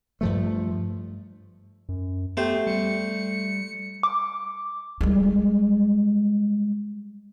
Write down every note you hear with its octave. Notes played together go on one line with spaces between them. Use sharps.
G2 F3 A3
F#2
A3 B3 G4 C5
G3 C#7
D6
G3 G#3